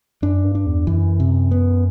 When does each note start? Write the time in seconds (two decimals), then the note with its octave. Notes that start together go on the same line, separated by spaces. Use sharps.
0.22 F#2 D4
0.44 G2
0.55 D4
0.66 E2
0.87 F#2 E3
1.20 C3
1.51 B3